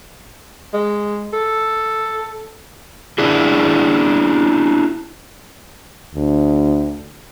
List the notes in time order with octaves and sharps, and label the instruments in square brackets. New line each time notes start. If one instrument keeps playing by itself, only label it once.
[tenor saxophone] G#3
A4
[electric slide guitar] C#4 D4 E4 G#4
[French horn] D2